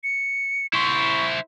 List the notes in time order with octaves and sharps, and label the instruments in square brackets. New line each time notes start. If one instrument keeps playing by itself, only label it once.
[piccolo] C#7
[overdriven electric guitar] E4 C5 [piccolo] C#6